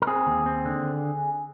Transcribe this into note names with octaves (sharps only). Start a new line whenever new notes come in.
A#4
C4 G#4
D#2
C4
D3